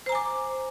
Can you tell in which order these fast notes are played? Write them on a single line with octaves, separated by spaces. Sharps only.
C5 A#5 G#5 D6